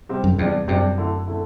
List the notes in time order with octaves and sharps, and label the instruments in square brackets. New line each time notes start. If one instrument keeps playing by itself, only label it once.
[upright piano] C3 G3 C4
[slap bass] F#2
[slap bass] E2 [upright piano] C3 G3 D4
[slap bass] F#2 [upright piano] C3 G3 D4
[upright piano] D3 A3 E4
D3 A3 E4